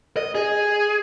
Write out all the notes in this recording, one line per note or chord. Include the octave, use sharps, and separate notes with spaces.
D#5
G#4